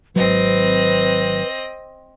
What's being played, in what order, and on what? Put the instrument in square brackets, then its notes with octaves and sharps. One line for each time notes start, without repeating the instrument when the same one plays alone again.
[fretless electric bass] G#1 F#3 [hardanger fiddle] C4 D#5 [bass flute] B4